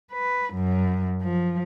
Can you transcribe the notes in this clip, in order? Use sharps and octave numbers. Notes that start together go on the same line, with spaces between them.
B4
F#2
F3